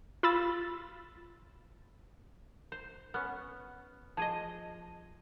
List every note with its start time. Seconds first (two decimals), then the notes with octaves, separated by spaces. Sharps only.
0.23 F4 B5 E6 A6
2.72 C5
3.14 B3 C#4 F6 F#6
4.17 F3 G#4 D#5 A5 G#6 D#7